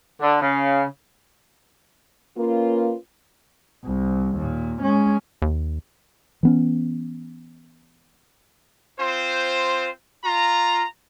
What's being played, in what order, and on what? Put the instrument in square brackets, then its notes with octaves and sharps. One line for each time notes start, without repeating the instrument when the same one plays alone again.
[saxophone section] D3
C#3
[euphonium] A#3 [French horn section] C#4 F4 B4
[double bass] C2
D#2 A#2
G#3 C#4
[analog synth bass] D#2
[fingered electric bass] E3 B3 C#4
[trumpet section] C4 F4 C5
F4 A#5